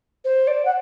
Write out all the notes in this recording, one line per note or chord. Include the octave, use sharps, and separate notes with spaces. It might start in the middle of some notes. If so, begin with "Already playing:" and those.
C5
D5
F#5